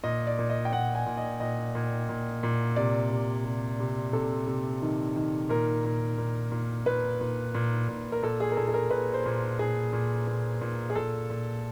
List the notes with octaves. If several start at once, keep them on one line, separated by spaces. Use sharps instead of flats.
A#2 D#5
D5
A#2
D#5
G5
A#2 F#5
G#5
A#2
D#5
A#2 D#5
A#2
A#2
A#2
C3 D5
C3
C3
C3
C3 A4
C3
D#3
D#3
A#2 A#4
A#2
A#2
A#2
A#2 B4
A#2
A#2
A#2
A#4
A#2 A4
G#4
A#4
A#2 A4
A4
A#4
A#2 B4
C5
A#2
A#2 G#4
A#2
A#2
A#2
G#4
A#2 A4
A#2